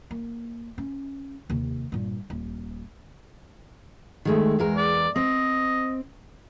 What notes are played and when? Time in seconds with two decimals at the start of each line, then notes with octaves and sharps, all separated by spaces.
0.11 A#3
0.78 C#4
1.50 D#2 C3
1.92 G2 A#2
2.30 D#1
4.25 D#3 G#3 A3
4.59 E2 G#3 A#4
4.77 D5
5.16 C4 D#5